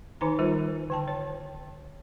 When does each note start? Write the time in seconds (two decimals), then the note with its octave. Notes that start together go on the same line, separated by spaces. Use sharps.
0.21 D#3 D#4 B4 G#5 A#5
0.39 G3 F4 A#4 C5
0.90 D3 G5 A5
1.08 C#5